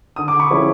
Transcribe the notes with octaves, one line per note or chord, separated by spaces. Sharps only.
D3 D#6
D6
B5 C#6
F3 G#3 C#4 E4